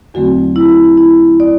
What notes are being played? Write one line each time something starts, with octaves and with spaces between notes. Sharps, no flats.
E2 D3 F#3 A3 C4 F#4
E4
E4
D5